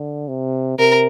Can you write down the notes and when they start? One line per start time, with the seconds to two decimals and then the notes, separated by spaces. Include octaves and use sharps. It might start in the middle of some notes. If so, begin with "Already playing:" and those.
Already playing: D3
0.28 C3
0.79 C3 A#4